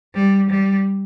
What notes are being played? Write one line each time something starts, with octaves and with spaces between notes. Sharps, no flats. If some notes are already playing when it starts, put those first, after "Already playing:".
G3
G3